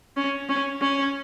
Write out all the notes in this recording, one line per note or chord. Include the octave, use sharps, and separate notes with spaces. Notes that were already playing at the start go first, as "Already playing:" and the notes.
C#4
C#4
C#4